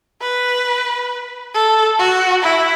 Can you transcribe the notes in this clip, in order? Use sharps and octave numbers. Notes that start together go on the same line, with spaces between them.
B4
A4
F#4
E4